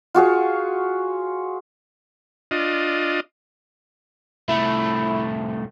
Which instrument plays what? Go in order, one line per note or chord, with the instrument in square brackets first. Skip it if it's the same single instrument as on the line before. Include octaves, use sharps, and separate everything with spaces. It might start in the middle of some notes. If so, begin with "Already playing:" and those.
[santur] F4 F#4 G#4 C#5
[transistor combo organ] D4 F4 D#5
[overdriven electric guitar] C2 A3 [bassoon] E4